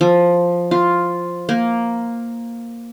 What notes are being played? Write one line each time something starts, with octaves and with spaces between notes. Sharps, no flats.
F3
F4
A#3